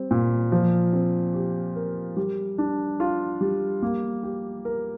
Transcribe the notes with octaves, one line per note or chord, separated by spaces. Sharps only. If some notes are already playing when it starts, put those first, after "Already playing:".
Already playing: G3 C4
A#2
F3
C4
G4
A#4
G3
D4
F4
G3
A#3
G4
A#4